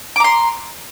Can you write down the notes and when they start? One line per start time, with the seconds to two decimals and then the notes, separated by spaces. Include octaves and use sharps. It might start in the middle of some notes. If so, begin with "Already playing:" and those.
0.16 D6
0.20 A#5
0.24 C6